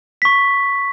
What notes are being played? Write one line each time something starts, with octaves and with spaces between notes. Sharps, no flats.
C#6 B6